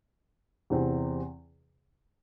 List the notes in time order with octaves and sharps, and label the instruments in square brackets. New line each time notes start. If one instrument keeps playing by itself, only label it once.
[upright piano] E2 C3 E3 C4